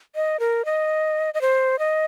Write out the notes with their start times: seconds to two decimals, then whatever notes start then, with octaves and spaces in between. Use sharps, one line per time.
0.15 D#5
0.40 A#4
0.65 D#5
1.34 D#5
1.41 C5
1.79 D#5